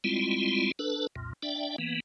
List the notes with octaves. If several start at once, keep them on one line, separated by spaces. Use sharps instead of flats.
G3 G#3 C4 E4 F4
D4 A4 B4
C2 F2 A#2
D4 D5 E5 G5
E3 A#3 B3